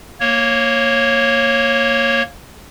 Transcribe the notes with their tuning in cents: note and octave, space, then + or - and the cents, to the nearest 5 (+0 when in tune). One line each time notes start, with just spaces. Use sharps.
A#3 +0 C#5 -15